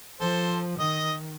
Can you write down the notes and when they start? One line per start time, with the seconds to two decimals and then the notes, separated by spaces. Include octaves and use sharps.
0.21 F3 A4 C5
0.79 D#3 D#5 D#6